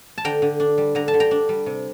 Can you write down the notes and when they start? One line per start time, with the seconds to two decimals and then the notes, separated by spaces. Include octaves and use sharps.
0.18 A5
0.24 D3 G5 A#5
0.42 D3
0.60 D4
0.78 G3
0.95 D3 A#5
1.08 A5
1.14 D3
1.20 G5 A#5
1.31 D4
1.49 G3
1.66 C3